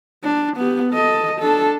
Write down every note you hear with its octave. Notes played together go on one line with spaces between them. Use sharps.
D4
B3 G4
A4 D#5
D4 A4